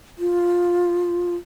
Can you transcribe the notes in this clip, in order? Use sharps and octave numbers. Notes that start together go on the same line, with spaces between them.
F4